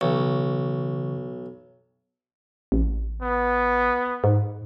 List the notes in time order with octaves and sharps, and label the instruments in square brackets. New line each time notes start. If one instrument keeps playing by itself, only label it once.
[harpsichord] B1 [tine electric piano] C#3 E3 C#6
[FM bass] A1
[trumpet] B3
[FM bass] G#2